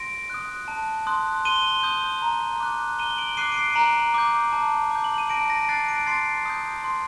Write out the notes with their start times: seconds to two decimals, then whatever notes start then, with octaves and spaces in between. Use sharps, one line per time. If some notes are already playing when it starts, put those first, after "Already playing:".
Already playing: C6 A#6 D7
0.30 D#6 F#6
0.68 A5
1.07 C6 D#6 F#6
1.45 C6 D#7 G7
1.83 D#6 G6
2.22 A#5
2.60 D6 F#6
2.99 A#5 D#7 G7
3.18 D7 F#7
3.37 D6 F#6 C7 D#7
3.52 D7
3.57 C7 D#7
3.76 A#5 D7 F#7
4.14 D6 G6
4.53 A5
4.92 D6 G6
5.04 F#7
5.18 D#7
5.30 A5 A#6 D7
5.50 A#6 D7
5.63 D7
5.69 D6 F#6 A6 C7
5.88 A#6 D7
6.07 C6 A6 C7
6.46 D#6 G6
6.84 C6